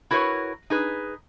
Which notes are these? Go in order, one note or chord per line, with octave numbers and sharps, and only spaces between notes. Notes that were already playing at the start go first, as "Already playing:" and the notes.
E4 F#4 A#4 B4 C#5
D#4 G#4 B4